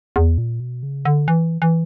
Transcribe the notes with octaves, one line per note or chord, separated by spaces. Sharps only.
E2
A#2
B2
C#3
D3
E3
E3